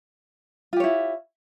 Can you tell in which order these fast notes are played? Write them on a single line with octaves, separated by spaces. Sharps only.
F4 G4 C#5 E4